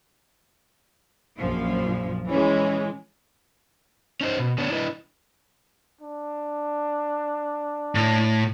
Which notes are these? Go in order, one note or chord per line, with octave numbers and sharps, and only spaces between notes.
A#1 F#2 F3
E3 G#3 C#4
C#4 D#4 C5
B2
D3 B3 D4 C#5
D4 E4 B4 D#5
D4
A2